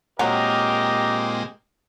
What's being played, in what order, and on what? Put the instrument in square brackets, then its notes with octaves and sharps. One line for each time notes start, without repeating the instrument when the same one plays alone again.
[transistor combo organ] A#2 G#3 C4 [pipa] F#3 [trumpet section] G4 A#4 D#5